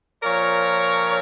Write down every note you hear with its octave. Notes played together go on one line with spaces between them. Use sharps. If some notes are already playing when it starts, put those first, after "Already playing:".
A#2 F3 A#4 C#5